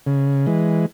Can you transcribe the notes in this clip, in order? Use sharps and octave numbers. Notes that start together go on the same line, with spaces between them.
C#3
E3 G#3